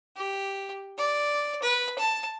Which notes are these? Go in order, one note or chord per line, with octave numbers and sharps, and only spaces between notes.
G4
D5
B4
A5